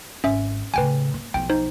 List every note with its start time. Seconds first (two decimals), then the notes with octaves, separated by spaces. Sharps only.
0.24 G#1 C#4 E5
0.74 A2 C#3 B4 G5 G#5
1.14 A#3
1.34 B1 F3 G5
1.50 D#4 C5